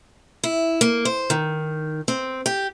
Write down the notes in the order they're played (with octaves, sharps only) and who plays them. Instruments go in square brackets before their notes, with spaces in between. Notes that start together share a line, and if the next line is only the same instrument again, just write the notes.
[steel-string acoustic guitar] E4
A#3
C5
D#3
C4
G4